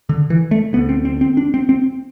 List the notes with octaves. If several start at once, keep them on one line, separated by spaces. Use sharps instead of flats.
D3
E3
A3
D2 D3 B3
C4
C4
C4
D4
C4
C4